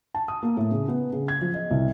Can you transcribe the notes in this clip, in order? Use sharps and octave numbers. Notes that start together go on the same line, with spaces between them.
A5
D#6
A#3
A2
C#3
B3
C#3
G#6
F3
D#5
C2